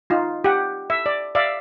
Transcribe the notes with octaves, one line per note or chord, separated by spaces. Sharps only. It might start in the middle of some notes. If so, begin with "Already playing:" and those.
D#4 F4
G4 F#5
E5
D5
D5 E5 F5